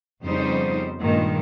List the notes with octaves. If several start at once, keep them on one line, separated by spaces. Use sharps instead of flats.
F2 C#3 G3 B3 D#4 C5
G2 A#2 D#3 G#3